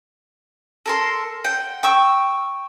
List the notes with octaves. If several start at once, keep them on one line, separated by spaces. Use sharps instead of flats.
A4 A#4 C6
F#5 G5
G5 C#6 E6